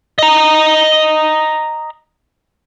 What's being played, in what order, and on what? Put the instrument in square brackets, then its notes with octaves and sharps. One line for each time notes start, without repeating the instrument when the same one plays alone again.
[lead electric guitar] D#5 A#5